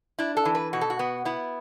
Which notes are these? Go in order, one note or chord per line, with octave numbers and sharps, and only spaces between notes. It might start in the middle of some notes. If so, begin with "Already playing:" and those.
D4 E4
A4
E3
B4
B2 F#4
A4
F#4
B3
B3 E4